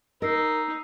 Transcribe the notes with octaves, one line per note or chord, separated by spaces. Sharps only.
D#4 A#4 D#5 E6 C7